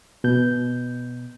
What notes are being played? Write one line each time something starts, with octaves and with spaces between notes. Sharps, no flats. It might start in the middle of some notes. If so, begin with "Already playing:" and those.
B2 G6